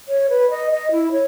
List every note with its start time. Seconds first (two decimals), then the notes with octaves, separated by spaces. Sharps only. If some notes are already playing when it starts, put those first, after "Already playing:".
0.08 C#5
0.30 B4
0.50 D#5
0.71 D#5
0.92 E4
1.12 C#5